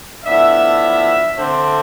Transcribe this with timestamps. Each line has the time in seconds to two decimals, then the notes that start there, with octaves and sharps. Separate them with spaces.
0.25 A2 F3 B3 D4 E5
1.36 D3 A3 C4 C5